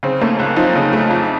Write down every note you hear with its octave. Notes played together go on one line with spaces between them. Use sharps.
C#3 C4
A3 A#3 C#4
C#2
F3 C4 D#4
C#3
A3
F2